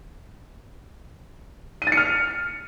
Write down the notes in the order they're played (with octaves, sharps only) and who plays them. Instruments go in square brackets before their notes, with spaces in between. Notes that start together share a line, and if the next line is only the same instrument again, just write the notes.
[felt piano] D#7
A6
C#7
F6